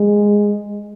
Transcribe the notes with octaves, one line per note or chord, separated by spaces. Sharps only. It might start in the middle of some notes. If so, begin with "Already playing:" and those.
Already playing: G#3